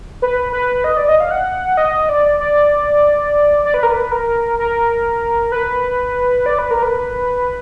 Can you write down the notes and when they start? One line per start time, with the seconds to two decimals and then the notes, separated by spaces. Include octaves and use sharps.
0.22 B4
0.53 B4
0.84 D#5
0.97 D5
1.09 D#5
1.20 F5
1.31 F#5
1.77 D#5
2.09 D5
2.40 D5
3.65 D5
3.74 B4
3.83 A#4
3.91 B4
4.12 A#4
4.59 A#4
5.52 B4
6.46 D5
6.59 B4
6.71 A#4
6.83 B4